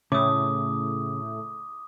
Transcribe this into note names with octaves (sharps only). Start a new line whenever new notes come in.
A2 C#3 A3 D6 D#6